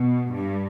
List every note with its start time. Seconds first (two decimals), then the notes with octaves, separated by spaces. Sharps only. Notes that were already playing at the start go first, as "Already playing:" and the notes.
Already playing: B2
0.31 G2